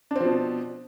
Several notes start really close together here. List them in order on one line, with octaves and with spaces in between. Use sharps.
D4 C4 F3 B2